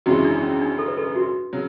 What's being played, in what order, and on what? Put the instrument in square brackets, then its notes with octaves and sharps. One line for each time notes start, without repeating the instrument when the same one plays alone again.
[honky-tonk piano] G#1 F#2 C#3 E3 G#3 [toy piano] F#4
[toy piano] D4
C#4
D4
A4
B4
A4
F#4
[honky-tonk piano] C#3 F#3